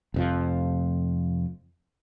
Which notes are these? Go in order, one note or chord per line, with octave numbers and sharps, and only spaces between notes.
F1 F2 F3